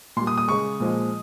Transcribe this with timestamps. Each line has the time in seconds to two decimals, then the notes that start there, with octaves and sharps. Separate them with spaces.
0.16 A#2 C6
0.21 G3
0.27 D#6
0.37 D#6
0.48 C#3 G#3 C#6
0.80 A#2 F3 G#3